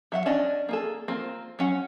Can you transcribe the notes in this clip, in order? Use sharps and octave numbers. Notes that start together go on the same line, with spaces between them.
F#3 E5 F#5
C#4 D4 D5 D#5
A#3 G#4 A4
A#3 C4 F4
F#3 C#4 F#5